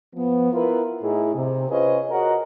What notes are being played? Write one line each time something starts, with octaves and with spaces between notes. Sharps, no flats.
F3 B3
B3 E4 F4 A#4 B4
A2 D#4 E4 G#4
C3
C#4 F4 G#4 B4 C5 D#5
F#4 G#4 A#4 C#5 D#5 F#5